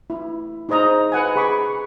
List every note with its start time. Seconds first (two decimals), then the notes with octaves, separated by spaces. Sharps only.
0.10 E4
0.69 D#4 G#4 C5 D#5 A#5
1.12 B4 F#5 G#5
1.36 G#4 B5 C#6 D6